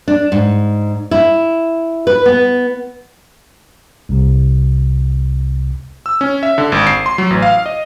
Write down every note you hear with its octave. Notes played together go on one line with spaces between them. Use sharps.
D4
G#2
E4
B4
B3
C2 C3
E6
C#4
E5
D3
G#1
C7
C6
F#3
A1
F5
D#5